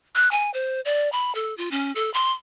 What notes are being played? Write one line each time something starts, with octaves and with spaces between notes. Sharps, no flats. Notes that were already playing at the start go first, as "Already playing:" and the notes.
F#6
G#5
C5
D5
B5
A4
F4
C#4
A4
C6